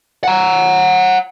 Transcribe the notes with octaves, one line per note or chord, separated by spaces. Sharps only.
F#5 A#5